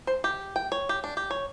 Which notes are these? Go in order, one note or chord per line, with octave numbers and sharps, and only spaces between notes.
C5
G4
G5
C#5
G4
D4
G4
C#5